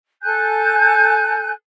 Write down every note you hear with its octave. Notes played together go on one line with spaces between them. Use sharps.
A4 G#5 F#6 G6